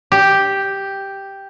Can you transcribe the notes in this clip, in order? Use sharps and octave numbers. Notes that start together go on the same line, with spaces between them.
G4